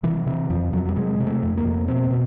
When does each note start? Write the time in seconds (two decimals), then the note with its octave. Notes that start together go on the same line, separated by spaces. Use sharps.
0.03 C3 E3
0.27 C3 E3
0.50 F2 F3
0.73 F2 F#3
0.89 G3
0.96 C3 G#3
1.20 C3
1.27 A3
1.43 F2
1.57 A#3
1.65 F2
1.88 B2 C4
2.11 B2